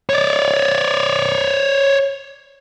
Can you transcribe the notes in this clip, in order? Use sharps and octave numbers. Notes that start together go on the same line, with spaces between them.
C#5 D5